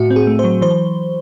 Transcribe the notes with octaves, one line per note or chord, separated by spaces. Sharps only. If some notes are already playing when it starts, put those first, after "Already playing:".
Already playing: A2 F#4
C4
G#4
A3
C5
F#3
E3 C5